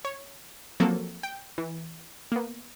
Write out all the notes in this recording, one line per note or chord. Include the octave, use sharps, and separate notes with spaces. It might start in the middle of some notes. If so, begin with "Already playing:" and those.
C#5
F3 F#3 A#3 C4 F#4 A4
G5
E3
A#3 B3